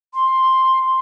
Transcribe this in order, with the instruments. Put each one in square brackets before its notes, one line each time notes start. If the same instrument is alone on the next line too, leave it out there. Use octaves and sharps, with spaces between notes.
[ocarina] C6